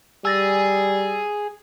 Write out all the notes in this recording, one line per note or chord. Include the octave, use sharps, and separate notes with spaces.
G3 G#4 E6 A6 A#6